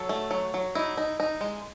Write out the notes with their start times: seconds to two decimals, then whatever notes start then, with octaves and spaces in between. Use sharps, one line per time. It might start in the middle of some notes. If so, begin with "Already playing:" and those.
Already playing: F#3 A4
0.09 A3
0.31 F#3
0.54 F#3
0.75 D#4 E4
0.97 D#4
1.20 D#4
1.41 G#3